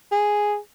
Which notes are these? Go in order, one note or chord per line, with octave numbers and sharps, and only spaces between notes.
G#4